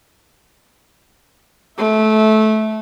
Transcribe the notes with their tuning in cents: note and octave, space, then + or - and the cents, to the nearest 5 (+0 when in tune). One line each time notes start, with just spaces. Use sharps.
A3 -20 E5 -10